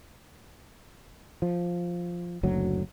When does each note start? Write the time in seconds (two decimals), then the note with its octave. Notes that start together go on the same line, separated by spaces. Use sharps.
1.42 F3
2.43 F#1 D2 F#3